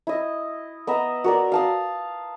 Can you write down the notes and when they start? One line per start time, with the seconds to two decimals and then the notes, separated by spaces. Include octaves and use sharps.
0.07 E4 D#5
0.87 B3 D#5 E5 A#5
1.24 F#4 A#4 D5
1.52 F5 A5 D#6